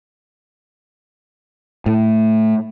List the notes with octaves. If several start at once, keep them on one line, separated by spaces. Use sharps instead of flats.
A2